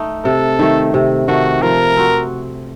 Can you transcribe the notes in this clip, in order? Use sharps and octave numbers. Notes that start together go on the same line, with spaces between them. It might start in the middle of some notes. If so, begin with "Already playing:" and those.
Already playing: A3 D#4
C3 A4
D#3 A3
C3
D#3 A3 F#4
F3 A#4
C4 F#4